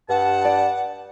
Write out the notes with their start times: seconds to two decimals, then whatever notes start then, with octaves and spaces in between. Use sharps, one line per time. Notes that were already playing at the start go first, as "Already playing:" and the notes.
0.09 G2 F#5 A5
0.45 D5